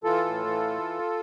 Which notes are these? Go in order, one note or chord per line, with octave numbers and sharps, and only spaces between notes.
E3 F4 A4
A2
E3